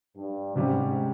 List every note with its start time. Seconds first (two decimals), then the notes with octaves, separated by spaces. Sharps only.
0.17 G2
0.55 G#2 C3 G3 C#4 G4